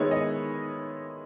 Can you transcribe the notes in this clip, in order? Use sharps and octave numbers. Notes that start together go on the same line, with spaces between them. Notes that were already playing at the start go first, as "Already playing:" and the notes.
Already playing: D#3 G#3 B3 E4 C#5
D#5